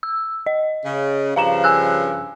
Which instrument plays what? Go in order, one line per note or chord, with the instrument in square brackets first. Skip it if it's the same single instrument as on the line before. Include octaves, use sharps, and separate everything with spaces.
[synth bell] E6
D#5
[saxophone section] C#3
[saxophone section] G2 C#3 F3 [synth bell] F5 A#5 E7
[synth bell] G#5 E6 F#6